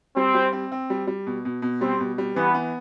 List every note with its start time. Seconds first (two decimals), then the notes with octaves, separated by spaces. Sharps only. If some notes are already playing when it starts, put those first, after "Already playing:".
0.16 G3 C4
0.35 G3
0.53 C4
0.72 C4
0.90 G3
1.07 G3
1.27 B2
1.45 B2
1.62 B2
1.81 G3 C4
2.00 B2
2.18 G3
2.36 E3 B3
2.54 B3